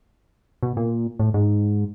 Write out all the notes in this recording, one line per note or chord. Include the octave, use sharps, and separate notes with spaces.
B2
A#2
A2
G#2